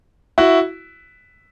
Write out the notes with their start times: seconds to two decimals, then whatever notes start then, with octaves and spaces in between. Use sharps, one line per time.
0.38 E4 F#4